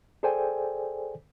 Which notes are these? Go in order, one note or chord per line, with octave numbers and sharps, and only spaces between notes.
G#4 A4 C5 D5 G5 G#5